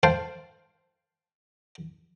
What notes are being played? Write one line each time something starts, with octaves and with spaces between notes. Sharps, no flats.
C5 F5 G5 A5